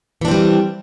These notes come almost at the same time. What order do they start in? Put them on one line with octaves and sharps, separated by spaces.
E3 D4 C4 G3